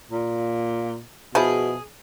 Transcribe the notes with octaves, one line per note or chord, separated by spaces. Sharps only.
A#2
B2 F3 E4 G#4